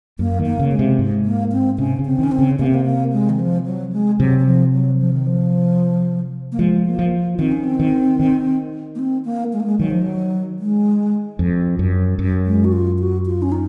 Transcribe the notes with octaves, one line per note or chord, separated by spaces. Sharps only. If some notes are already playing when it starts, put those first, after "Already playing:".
F#2 A#3
D#3
A#3
C#3
G#3
C3
G#2
A#3
C4
C3 C#4
C#3
C4
D#3 C#4
C4
C#3
C3 A#3
C4
A#3
A#3
G#3
D#3
F3
F#3
G#3
C3 F#3
F#3
F3
F#3
F3
D#3
F3
A#3
F3 G#3
A#3
F3
D#3 C4
C#4
C4
D#3
D#3
A#3
C4
A#3
G#3
A#3
G#3
D#3 F#3
F3
F#3
G#3
F2
F#2
F#2
G#3
F#4
F4
F#4
F4
C#4
D#4